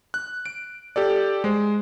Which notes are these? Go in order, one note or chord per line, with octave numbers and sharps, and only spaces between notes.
F#6
D7
G4 A4 D5
G#3 C5